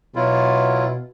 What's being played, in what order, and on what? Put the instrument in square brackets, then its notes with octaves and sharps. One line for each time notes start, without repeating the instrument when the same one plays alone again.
[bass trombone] B2 [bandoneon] F#3 E4 F4